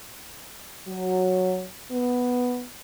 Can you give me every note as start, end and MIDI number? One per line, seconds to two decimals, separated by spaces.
0.88 1.64 54
1.91 2.64 59